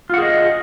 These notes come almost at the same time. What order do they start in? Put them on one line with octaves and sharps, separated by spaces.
F4 F#5 G#4 D#5